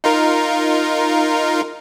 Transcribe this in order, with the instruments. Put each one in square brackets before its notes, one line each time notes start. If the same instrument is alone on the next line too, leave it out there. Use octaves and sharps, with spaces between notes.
[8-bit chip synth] D#4 F4 A#4